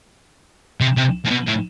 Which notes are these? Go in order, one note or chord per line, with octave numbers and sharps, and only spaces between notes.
C3
C3
A2
B2
A2